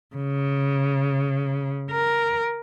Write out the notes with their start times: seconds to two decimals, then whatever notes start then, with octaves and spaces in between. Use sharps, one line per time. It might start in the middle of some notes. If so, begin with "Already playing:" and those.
0.16 C#3
1.90 A#4